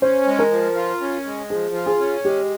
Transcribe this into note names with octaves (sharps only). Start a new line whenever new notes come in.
C#4 C5
G#3
A#4
F3
F4
C#4
G#3
F3 G#4
F4
G#4
C#4
G#3 G4